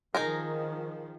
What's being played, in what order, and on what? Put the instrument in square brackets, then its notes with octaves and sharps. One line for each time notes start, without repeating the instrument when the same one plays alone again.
[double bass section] D#3 F3 [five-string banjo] D#4 G#4 A#4